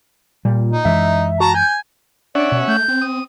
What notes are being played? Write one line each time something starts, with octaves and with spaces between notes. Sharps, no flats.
A#2 G3
D#4
F#2 E3 G#3 E5
F#4 A5 A#5
G#5 G6
C#4 D4 D5 E5 F#5
B2
A3 G6
C4
D#6